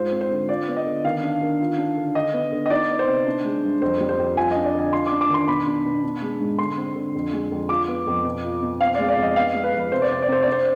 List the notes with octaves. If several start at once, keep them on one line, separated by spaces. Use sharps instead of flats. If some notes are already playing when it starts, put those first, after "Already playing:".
Already playing: G#2 F4 C5
C4
C5
D3
F4 D5
B3
D#5
D3
D#3 F5
D4
D#3
F4
D4
D3
D3 D#5
B3
D3
D#5
D#4 D5
B3
C5
C3
D4
G#3
G2
F2 C5
G3
C5
F2
F4 G#5
D4 D#5
D5
D3 D#5
F4 C6
D6
D4
D6
D#3
C6
B2 B5
D4
B2
D4
G#3
G#2
D3 C6
C4
D3
F2
G#3
F2
F4 D6
B3
F2
B2
F4
B2
C4 F5
G#3 D5
D5
F2 D#5
B3 F5
G#3
B4
F2
B4
C3 C5
D5
C4 C5
D5
C3 C5
C4 D5
C5